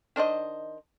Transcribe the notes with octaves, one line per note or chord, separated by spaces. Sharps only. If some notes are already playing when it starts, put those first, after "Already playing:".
D#3 D4 C5 D#5